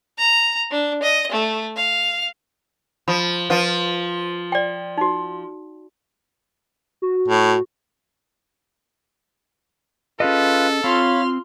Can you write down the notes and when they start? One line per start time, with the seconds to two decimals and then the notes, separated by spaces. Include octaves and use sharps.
0.18 A#5
0.71 D4
1.02 D#5
1.32 A3
1.76 F5
3.08 F3 B5
3.50 F3 F4 B4
4.52 D5 G5
4.97 D#4 F#4
7.02 F#4
7.28 A2
10.20 C#4 F4 G#4 A4 B4 D#5
10.84 C4 F4 C#5 F5 B5 C6 F6